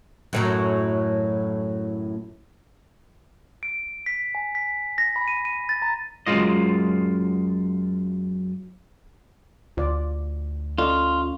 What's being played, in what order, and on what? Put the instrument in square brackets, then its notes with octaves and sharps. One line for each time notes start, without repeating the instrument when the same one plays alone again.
[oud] F#2 A2 F#3
[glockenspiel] D7
B6
G#5
B6
A#6
B5
D#7
D#7
A6
A#5
[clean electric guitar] F#2 D#3 G#3 F4 D#5
[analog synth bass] D2 [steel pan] F4 D5
[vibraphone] C#4 [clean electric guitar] F4 [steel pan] A4 D5 D#5